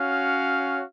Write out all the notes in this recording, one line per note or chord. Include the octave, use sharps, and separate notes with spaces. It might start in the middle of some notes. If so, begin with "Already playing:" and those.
Already playing: C#4 F#4 C#5 F5